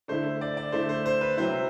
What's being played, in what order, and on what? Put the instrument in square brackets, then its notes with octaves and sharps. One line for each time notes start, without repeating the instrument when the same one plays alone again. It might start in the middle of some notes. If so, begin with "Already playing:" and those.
[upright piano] D3 A3 E4 [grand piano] C5
[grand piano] D5
D5
[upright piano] D3 A3 E4 [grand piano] C5
[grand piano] C5
C5
B4
[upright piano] C3 F#3 C4 E4 [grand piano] C5